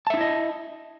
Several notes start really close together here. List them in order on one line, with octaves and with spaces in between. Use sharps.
A5 E5 D#4 E4 D#5